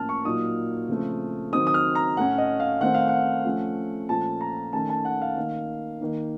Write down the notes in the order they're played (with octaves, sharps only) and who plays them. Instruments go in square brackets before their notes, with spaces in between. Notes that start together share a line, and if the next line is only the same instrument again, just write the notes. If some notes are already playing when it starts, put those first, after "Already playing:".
Already playing: [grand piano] A2 F3 A#3 C#4 A5 F6
C#6
A#2 F#3 A#3 D#4 D#6
C#3 F3 A3 C4
D#3 F#3 C4 D#4 D#6
D#6
F6
A#5
A2 A3 C#4 F#5
D#5
F5
D#3 A3 C4 D#4 F#5
F5
F#5
F3 A3 C#4
A#2 F3 A3 C#4 A5
A#5
D#3 A3 C#4 A5
A5
F#5
F5
D#3 A#3 D#4
D#3 A#3 D#4